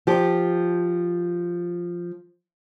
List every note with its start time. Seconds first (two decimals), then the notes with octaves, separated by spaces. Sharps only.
0.07 F3 G4